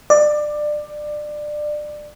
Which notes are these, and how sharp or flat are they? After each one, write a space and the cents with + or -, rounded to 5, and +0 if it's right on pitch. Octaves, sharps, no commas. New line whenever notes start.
D5 +20